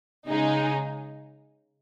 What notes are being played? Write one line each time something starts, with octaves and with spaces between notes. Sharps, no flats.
C#3 G#3 D#4 G#4